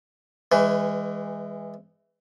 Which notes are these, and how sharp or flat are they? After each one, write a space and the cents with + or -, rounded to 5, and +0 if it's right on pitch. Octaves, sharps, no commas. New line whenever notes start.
E3 +0 G#3 -20 B4 +30